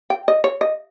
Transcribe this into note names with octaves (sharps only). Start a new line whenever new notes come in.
G5
D#5
C#5
D#5